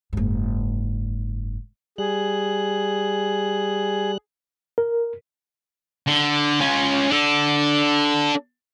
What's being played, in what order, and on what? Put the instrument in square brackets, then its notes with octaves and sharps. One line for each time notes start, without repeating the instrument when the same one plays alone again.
[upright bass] F#1 G#2
[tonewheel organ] G3 F#6 [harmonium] G#4
[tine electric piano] A#4
[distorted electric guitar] D3
C#4 F4
D4 A4